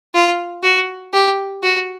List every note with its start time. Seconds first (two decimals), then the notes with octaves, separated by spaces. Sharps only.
0.14 F4
0.63 F#4
1.13 G4
1.63 F#4